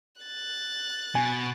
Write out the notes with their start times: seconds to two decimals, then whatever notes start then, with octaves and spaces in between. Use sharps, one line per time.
0.22 F#6 A6
1.15 B2 G#5